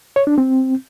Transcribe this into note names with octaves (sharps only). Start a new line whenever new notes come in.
C#5
D4
C4